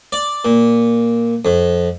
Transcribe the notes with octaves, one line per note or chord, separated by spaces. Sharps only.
D5
A#2
F2